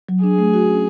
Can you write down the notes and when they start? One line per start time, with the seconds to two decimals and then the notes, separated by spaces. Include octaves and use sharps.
0.09 F#3
0.23 D4 G#4
0.39 A3
0.54 F#4
0.69 C#4